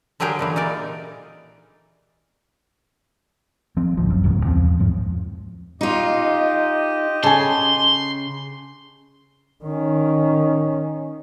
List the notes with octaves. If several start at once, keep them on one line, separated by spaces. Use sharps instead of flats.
D3 F#3 G4 G#4 A#4 G5
A#2 D3 E3
D#4 A#4 D5
F3 C4
A1 D2 F3
F#2
D#1 C#2 G#2 C#3
E2 F3 C4
E2 G#2 F3
D#4 F4 G4 D#5
C#3 A4 G#5 C6
D#3 C#4